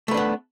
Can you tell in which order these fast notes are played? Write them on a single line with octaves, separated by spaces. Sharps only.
A3 B4 D4 B3